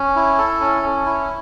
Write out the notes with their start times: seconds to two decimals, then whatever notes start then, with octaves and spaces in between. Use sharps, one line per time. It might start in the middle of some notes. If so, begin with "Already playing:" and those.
Already playing: C#4
0.16 E4
0.38 A4
0.60 C#4
0.82 C#4
1.06 E4